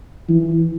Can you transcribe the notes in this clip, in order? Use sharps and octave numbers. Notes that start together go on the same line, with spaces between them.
E3